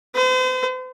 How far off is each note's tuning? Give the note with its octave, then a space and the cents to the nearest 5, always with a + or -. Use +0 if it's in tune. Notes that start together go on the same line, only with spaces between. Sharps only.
C5 -40